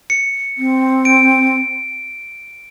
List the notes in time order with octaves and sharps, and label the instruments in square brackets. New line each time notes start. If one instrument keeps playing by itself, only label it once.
[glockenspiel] C#7
[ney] C4
[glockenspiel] D7